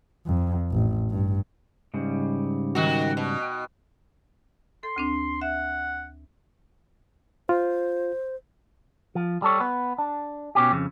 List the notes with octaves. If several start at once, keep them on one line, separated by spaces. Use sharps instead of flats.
F2
A1
G2
G#2 C#3 G3
D#3 F#4
B2
G5
A4 C6
D2 C4 D4
E5 F#5
F4 C5
F3
G3 A4 C#5
B3
D4
B2 C#4 G4
F2 C#3